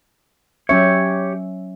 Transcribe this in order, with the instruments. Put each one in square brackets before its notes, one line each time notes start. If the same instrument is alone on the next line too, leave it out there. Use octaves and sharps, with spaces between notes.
[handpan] F#3 C#4 E5 [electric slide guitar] G4 C#5